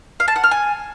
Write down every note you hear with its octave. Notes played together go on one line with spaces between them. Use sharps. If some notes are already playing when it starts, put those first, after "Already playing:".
F5
A5
F#5
F6
G#5